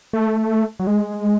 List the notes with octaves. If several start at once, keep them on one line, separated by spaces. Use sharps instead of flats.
A3
F#3
G#3